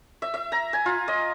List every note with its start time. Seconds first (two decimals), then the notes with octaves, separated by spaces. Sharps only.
0.22 E5
0.34 E5
0.52 A#5
0.73 G#5
0.86 F4
1.08 D#5